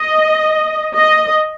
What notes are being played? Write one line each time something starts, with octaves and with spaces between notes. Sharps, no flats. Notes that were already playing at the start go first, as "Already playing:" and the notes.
Already playing: D#5
D#5